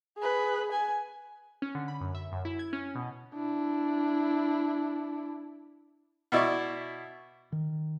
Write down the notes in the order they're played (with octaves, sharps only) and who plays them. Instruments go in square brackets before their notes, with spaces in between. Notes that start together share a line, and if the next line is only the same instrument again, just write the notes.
[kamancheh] G#4 B4
G#5
[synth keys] C#4
D3
B5
F#2
E5
F#2
E4
G#6
C#4
B2
[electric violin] D4 E4
[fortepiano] B2 E4 D5 C#6
[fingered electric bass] D#3